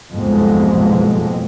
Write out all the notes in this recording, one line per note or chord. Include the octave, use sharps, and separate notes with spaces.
F#1 C2 F2 G#2 B2 G#3